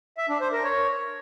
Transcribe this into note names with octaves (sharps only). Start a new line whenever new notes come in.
E5
D4
C5
A#4
C#5